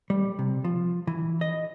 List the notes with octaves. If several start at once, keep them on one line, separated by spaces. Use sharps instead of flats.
G3
C3
F3
E3
D#5